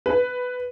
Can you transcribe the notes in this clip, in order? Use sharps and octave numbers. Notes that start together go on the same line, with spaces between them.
B4